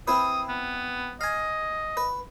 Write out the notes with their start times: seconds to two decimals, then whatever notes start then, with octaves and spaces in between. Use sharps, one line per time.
0.08 C4 E4 B4 D#6
0.49 B3
1.21 D#5 F5 G#5
1.97 B4